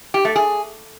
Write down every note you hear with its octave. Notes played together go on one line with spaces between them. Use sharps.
G4
A3
G#4